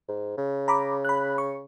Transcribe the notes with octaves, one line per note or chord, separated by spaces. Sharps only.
G#2
C#3
A#5 B5 D6
B5 F#6
C#6